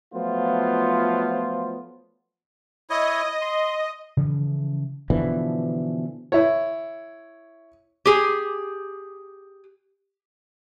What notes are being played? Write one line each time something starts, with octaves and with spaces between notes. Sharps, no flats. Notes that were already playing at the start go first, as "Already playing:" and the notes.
F3 F#3 A3 B3 F4 C5
E4 C#5 D#5
C6
C#3 E3 F3
B2 D3 E3 F3
E4 C#5
G4 G#4